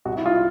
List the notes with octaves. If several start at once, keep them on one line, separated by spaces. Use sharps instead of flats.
C2 F#4
E4
F4